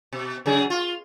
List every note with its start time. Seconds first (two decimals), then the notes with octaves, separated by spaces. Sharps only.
0.13 B2
0.46 C#3 F#3 G#4
0.70 F4